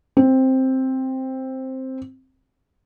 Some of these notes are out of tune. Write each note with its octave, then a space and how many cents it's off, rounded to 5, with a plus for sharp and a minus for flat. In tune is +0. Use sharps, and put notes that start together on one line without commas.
C4 +5